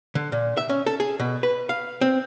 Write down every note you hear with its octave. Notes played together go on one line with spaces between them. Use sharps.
D3
A#2
E5
C#4
A4
G#4
B2
B4
F5
C4